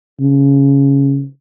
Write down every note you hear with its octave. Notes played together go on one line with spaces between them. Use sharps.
C#3